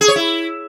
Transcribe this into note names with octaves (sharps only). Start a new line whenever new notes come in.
G#4
C#5
E4